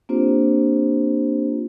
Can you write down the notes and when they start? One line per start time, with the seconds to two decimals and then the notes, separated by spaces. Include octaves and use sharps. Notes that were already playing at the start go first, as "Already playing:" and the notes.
0.09 A#3 C4 D4 F4 G4 C5